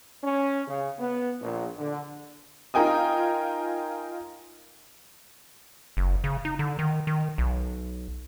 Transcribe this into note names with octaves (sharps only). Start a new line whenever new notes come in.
C#4
C#3
B3
A#1
D3
D#4 F4 A#4 G5 G#5 D#6
F#1
C#3
D#4
D3
D#3
D#3
B1